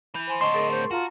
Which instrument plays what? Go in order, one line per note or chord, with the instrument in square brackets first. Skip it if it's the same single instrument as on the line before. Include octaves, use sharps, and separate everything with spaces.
[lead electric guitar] E3 [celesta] B5 G6
[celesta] C5 G#5 C6
[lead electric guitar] A2 D3 [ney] D#5 [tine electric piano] C6 C#6 [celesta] G7
[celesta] G#4 A#4 A6
[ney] C5
[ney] F4 [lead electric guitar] F#4 [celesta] A5 A#5